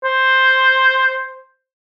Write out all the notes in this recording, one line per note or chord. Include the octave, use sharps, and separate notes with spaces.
C5